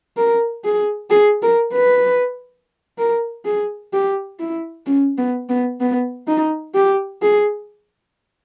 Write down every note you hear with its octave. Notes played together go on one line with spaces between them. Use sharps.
A#4
G#4
G#4
A#4
B4
A#4
G#4
G4
E4
C#4
B3
B3
B3
D#4
G4
G#4